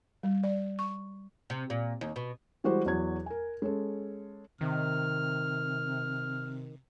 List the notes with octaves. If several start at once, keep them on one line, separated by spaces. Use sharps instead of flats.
G3
D5
C#6
C3
A#2
D#2
B2
E3 G3 G#3 F#4 G4 C5
E2 F#3 F#4 G#6
A#4 G#5
G#3 C#4 A4
C3 D#3 F6